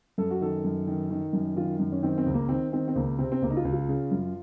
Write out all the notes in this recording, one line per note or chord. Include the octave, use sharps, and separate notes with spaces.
F#2 A4
F#4
D#3 A4
F#2
D#3
D#3
F#2
D#3 F4
F#2
C#4
D#3 C4
C4
C#2
A#3
D#3 C4
D#3 C4
C4
C#2 A#3
C3 C4
C4
C#2 A#3
D#4
F4
C#2
F4
C#3
F#2